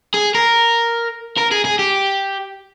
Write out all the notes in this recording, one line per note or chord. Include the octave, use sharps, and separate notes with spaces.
G#4
A#4
A#4
G#4
G#4
G4